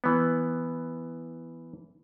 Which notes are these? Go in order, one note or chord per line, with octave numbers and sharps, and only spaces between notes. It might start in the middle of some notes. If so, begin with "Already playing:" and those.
E3 B3